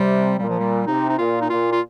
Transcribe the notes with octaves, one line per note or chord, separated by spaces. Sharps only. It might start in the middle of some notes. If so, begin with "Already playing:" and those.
Already playing: C3 G3
A#2 G3
F3
G3
C3 D#4
D#4
A#2 F4
D#4
A#2 F4
F4